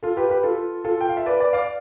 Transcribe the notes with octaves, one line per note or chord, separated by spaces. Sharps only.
F4 A4
G4 B4
G4 B4
F4 A4
F4 A4
G5
F5
E5
B4 D5
B4 D5
D5 F5